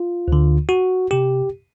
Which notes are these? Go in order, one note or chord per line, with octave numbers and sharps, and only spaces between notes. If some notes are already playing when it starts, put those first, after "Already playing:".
Already playing: F4
D2 D3
F#4
C3 G4